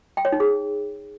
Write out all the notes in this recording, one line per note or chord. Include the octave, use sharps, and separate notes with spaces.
G5
C#5
D#4
G#4